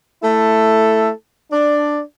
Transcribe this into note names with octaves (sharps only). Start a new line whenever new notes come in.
A3 E4 A4
D4 D5